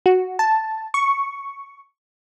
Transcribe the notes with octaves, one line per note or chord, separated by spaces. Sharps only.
F#4
A5
C#6